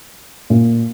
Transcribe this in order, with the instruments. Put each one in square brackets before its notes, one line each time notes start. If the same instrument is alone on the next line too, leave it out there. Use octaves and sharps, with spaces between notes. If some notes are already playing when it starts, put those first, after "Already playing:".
[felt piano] A#2